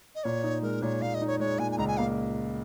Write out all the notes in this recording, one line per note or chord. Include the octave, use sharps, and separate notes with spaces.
D#5
A#2 C#5
D#4
G#3 A#4
A#2 C#5
A#2 F5
D#5
D#4
C#5
G#3 C#5
A#2 G#5
G#5
C#2 A#5
G#5
A#3 F5